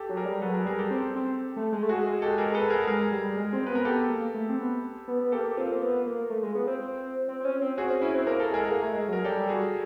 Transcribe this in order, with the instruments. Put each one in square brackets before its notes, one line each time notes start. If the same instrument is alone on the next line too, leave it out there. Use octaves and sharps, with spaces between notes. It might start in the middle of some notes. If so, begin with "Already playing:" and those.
Already playing: [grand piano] G4 A4
[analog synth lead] F#3
[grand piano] G#4 A#4
[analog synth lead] G3
[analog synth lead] F#3 [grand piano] A4 B4
[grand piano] G#4 A#4
[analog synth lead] G3 [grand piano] G#4 A#4
[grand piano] G4 A4
[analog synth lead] C4
C4
A3
G#3
A3
[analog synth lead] G#3 [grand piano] F#4 G#4
[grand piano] G4 A4
G#4 A#4
A4 B4
G#4 A#4
[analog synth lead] G#3 [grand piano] G#4 A#4
[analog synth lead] G3
G#3
C4
[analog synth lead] B3 [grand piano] B4
[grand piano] A#4
[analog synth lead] B3 [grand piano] G4 A4
[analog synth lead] A#3
A3
C4
B3
B3
B3
[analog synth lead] A#3 [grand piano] G4 A4
[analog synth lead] C4 [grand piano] F4
[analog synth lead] A#3
B3
A#3
A3
G#3
B3
C4
C4
C4
C4
C#4
C4
[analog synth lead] C4 [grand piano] F#4 G#4
[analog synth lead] C#4
[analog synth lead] C#4 [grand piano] E4
[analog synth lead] C4
[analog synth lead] A#3 [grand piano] A#4
[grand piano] A4
[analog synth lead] G#3 [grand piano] G#4 A#4
[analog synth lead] A#3
A3
G#3
[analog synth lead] F#3 [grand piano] A#4
[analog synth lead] G3 [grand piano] G4 A4
[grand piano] F#4 G#4